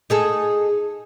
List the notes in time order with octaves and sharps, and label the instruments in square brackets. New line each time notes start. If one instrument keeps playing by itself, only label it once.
[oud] D#4 G#4 A4